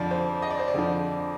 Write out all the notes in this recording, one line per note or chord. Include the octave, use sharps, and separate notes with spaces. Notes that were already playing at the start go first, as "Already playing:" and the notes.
Already playing: F2 D3 F3 D5
C5
D#5
D5
C5
D5
F2 D3 F3